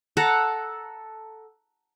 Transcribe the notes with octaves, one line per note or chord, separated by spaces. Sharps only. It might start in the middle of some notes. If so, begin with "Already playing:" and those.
A4 F#5 A5 A#5